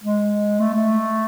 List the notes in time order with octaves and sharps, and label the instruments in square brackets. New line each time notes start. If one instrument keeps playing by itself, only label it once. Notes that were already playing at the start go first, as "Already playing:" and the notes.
[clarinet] G#3
A3
A3